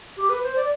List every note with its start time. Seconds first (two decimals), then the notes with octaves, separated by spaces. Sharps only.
0.17 G4
0.29 B4
0.43 C5
0.56 D5